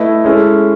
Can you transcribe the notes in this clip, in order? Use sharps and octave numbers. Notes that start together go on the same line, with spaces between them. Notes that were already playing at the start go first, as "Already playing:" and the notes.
Already playing: A3 E4 B4 D#5
G#3 C#4 E4 A4